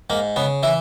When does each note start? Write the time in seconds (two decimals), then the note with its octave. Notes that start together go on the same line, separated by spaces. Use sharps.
0.10 G#2 A#3
0.36 C#3 B3
0.63 E3 E4